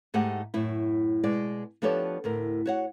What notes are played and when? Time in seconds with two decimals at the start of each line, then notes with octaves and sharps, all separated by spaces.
0.14 G#2 A3 D#4 G4 G#4 F#5
0.54 F#2 A2 E4
1.24 B2 G#3 D5
1.82 F3 B3 D4 G4 A4 C#5
2.24 D2 A2 A#4
2.66 F#4 C#5 F#5